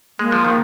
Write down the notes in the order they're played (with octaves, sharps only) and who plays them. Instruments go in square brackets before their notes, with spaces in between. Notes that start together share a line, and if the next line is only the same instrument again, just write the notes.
[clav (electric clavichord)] G#3 [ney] A#3
[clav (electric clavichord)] F3
D#3